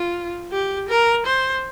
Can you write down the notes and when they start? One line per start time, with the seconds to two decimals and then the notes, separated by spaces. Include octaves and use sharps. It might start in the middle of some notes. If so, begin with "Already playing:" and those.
Already playing: F4
0.51 G4
0.88 A#4
1.26 C5